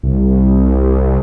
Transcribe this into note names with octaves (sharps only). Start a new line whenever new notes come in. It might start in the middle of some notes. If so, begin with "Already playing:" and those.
C2